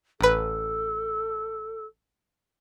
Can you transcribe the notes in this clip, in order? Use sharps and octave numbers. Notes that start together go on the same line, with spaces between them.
A1 A4 B4